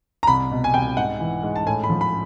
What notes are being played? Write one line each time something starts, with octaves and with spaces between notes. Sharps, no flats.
A#5
C2 B5
B2
G#5
C2 G5
G#2 F#5
E3
G#2
A5
A2 G#5
B5
F3
B5